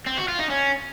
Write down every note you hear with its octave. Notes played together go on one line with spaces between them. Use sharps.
C4
F#4
F4
D#4
C#4